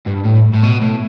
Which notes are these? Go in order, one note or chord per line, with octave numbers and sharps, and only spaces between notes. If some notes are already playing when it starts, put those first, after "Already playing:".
G2
A2
A2
B2
A2